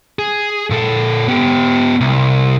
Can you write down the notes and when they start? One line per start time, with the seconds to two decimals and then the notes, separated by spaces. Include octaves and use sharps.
0.19 G#4
0.70 A#2 A4
1.28 B3 G4
2.01 C2